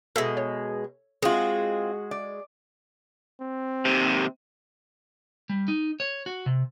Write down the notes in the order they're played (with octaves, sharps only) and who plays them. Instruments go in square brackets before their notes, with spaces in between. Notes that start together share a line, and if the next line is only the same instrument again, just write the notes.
[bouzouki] B2 G#3 [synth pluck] A4 E5
[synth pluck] C#5
[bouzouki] G#3 F#4 [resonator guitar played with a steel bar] C4 F4 [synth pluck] G#4
[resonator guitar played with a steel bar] D5
[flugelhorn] C4
[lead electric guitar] D#2 C3
[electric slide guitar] G3
D#4
C#5
F#4
C3